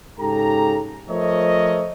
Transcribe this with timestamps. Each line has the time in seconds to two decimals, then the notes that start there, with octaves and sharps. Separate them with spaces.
0.19 G#2 C#3 G4 A4 A#5
1.09 F3 A3 A#4 C5 C#5 D#5